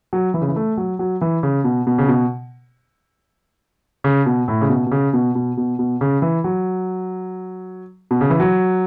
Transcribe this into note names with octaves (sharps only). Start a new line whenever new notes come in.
F#3
E3
C#3
E3
A3
F#3
F#3
E3
C#3
B2
B2
C#3
B2
C#3
B2
A2
C#3
B2
B2
C#3
B2
B2
B2
B2
C#3
E3
F#3
B2
C#3
E3
F#3